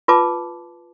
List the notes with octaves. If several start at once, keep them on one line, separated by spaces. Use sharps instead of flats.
F4 B4 A5 D6